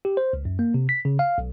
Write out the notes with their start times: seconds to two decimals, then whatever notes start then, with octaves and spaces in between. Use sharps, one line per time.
0.05 G4
0.17 C5
0.33 C#2
0.45 F#2
0.59 A#3
0.74 C3
0.89 B6
1.05 C#3
1.19 F5
1.38 B1